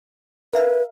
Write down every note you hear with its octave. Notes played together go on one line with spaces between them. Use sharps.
A#4 B4 E5 F5